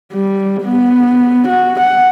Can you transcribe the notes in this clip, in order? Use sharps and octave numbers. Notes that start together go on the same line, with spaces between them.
G3
B3
F#4
F#5